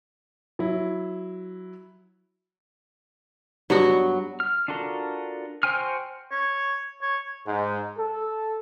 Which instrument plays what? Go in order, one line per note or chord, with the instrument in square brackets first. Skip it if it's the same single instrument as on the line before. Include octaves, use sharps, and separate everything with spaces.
[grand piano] F#3 E4
[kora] G2 B3 F#4 [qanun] F#3
[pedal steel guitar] F6
D4 F4 F#4 A4 A#4
F#4 C5 G5 G#5 F6
[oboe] C#5
C#5
[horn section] G#2
A4